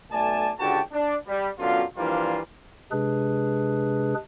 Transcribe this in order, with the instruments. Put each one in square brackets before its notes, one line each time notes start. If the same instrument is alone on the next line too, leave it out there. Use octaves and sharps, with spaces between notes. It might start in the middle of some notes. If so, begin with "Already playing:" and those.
[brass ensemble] B1 A3 D5 G#5 A5
C#2 D3 F#4 G4 G5 A5
D4
G3
F#2 B2 D3 F4
E3 F3 G3 A#3 D4 F4
[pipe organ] C3 G#3 D4 G#4 B4